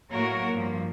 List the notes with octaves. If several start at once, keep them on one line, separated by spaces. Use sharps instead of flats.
A2 F#3 A#3 F#4 A#4 C#5
G2 F3 A#3